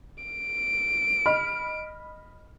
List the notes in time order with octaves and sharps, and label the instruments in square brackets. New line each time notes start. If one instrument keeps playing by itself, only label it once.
[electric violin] D7
[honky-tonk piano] D#5 B5 F6